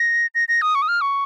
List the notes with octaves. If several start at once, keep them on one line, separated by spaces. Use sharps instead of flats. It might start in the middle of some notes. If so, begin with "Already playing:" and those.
Already playing: A#6
A#6
A#6
D#6
C#6
D#6
F6
C#6